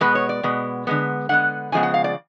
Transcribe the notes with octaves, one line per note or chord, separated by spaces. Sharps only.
B2 G#3 B3 B4
C#5
D5
B2 G#3 B3
D3 G#3 B3
D3 G#3 B3 F#5
C#3 F3 G#3 B3 G#5
F#5
F5
D5